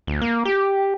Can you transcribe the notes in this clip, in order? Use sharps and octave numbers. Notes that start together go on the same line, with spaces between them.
D2
A#3
G4